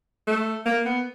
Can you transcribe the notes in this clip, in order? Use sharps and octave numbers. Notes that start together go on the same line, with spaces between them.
A3
A#3
B3